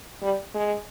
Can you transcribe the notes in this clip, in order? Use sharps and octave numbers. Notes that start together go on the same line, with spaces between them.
G3
G#3